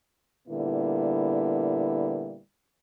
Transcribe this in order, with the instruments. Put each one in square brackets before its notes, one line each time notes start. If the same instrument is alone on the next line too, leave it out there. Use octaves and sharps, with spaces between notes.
[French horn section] A#2 D3 G3 B3 E4